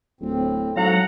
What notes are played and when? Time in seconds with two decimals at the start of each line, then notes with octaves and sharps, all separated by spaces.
0.21 D1 A2 C4
0.76 G#2 F#3 A4 C#5 F5 F#5 A#5